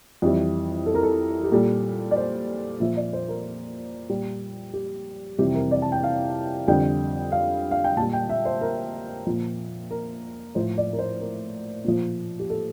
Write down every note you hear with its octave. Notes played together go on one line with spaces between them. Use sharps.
F2 E3 G3
A4
A#4
A4
G4
A#2 G3 A4
D5
C5
A#2 F3 E5
D5
C5
A#4
A#2 G3
G4
F2 C3 E3 G3 G4
A#4
D5
A5
G5
F5
F2 D3 G3 G5
F5
F5
G5
A#2 G3 A5
G5
E5
C5
A#4
A#2 F3
A#4
A2 F3 C5
D5
A#4
C5
A#4
A#2 F3
G4
A4